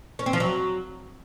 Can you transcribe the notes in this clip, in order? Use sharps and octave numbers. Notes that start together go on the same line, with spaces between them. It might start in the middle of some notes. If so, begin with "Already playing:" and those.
C#4
C4
F3
F#3